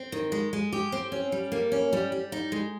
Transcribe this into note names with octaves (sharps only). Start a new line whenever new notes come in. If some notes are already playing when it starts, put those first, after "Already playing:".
Already playing: C4
D#3
G#3
G#3
G4
C4
C#4
G3
A#3
C#4
G3
G3
D#4
G#3